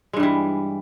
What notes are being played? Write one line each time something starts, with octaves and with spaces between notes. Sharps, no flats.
G2 E3 G3 G#3